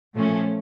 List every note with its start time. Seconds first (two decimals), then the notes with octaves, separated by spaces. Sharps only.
0.14 A#2 F3 A3 C#4